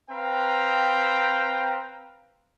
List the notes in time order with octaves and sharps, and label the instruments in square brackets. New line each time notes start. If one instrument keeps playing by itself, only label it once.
[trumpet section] C4 B4 F5 G5 A#5